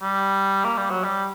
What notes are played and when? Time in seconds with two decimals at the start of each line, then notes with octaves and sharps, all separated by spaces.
0.02 G3
0.64 A#3
0.77 G3
0.90 F#3
1.04 G3